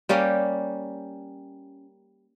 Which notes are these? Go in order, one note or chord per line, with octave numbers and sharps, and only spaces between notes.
G3 A#3 C#4 G4